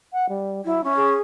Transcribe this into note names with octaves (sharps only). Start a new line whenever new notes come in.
F#5
G3
F#3 E4
C#4 E5
G#4